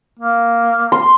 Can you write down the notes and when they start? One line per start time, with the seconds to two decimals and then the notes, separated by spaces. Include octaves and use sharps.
0.19 A#3
0.92 C6